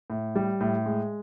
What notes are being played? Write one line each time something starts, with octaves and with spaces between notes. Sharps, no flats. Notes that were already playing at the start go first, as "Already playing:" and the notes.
A2
G3
A2
G#3